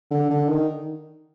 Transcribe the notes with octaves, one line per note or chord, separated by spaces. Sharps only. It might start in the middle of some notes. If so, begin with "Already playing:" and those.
D3
D3
D#3